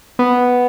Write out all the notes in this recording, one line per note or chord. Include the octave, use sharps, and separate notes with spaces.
B3